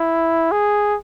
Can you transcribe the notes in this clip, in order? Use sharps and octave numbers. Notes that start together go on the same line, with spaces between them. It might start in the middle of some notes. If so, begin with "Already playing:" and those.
Already playing: E4
G#4